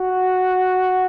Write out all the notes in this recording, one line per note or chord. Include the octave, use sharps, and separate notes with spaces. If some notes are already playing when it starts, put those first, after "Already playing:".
Already playing: F#4